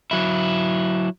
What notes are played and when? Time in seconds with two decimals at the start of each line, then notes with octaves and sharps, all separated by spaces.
0.11 F#3 E4